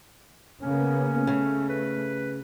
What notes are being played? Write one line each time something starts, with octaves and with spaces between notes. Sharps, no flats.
C#3 A#3 B3 C#4
C#3 A3
B4